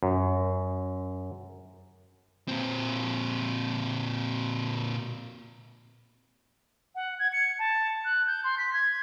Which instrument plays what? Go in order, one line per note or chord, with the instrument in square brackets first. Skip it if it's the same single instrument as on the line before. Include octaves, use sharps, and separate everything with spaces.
[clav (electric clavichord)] F#2
[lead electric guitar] A#2 C4
[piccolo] F#5
G#6
C#7
A5
F#6
G6
C6
B6
G#6